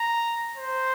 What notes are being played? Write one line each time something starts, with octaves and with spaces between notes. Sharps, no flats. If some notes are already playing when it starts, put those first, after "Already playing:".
Already playing: A#5
C5